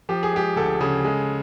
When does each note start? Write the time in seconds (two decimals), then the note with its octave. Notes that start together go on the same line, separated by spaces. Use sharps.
0.09 F3 G4
0.23 G#4
0.33 G#3 G4
0.56 D2 A4
0.81 C#3
1.05 G#3